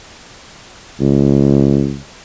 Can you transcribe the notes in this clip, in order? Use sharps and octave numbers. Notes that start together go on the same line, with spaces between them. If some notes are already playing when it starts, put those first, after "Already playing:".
C#2